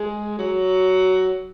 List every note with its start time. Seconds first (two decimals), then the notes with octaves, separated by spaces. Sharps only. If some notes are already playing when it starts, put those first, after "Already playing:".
Already playing: G#3
0.39 F#3